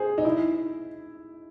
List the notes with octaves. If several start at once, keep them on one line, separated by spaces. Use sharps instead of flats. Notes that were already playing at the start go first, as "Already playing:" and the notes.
Already playing: G#4 C5
D#4
E4